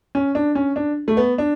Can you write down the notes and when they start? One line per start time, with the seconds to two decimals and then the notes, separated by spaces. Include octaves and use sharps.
0.15 C#4
0.35 D4
0.55 C#4
0.76 D4
1.08 A3
1.17 B3
1.38 D4